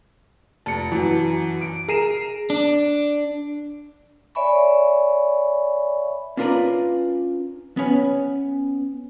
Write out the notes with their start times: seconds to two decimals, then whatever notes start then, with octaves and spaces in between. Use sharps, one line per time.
0.66 F1 A5 C#7
0.92 F#2 E3
1.61 D7
1.88 G#4 A#4 C7 D#7 E7
2.50 D4
4.35 C#5 D5 E5 G#5 B5 C#6
6.37 C#4 D4 F4 A#4 B4 D5
7.77 B3 C#4 B4